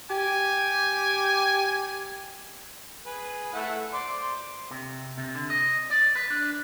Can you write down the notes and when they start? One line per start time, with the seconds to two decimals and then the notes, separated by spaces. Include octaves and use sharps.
0.10 G4 G#5
3.06 G#4 B4
3.53 A3 E4 F#5
3.93 C5 D5 C6
4.71 C3
5.18 C3
5.35 D3
5.50 D#5
5.90 D5
6.15 B4
6.30 D4